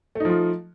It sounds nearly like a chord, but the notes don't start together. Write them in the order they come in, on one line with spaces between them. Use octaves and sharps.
A3 D#4 F3 F4